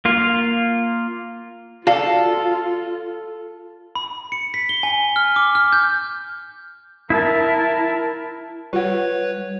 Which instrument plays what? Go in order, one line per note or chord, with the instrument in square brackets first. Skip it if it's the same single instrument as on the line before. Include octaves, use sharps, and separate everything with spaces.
[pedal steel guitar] A#3 F4
[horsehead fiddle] F4 [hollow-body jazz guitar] F#4 D5 F5 [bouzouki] A4
[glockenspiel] B5
C#7
B6
G7
G#5
F6
D6
F6
G6
[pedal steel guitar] E4 [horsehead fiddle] A#4 A5
[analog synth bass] G3 [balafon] F4 F#5 [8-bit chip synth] B4 C#5